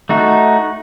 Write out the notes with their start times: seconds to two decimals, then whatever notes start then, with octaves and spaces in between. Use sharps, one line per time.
0.09 A3 D#4 F#4